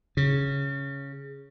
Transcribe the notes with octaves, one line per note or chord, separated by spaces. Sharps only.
C#3